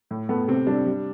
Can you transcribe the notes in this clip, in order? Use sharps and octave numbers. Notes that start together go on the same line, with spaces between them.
A2
A3 B3
C3 C4
G3 D4
G3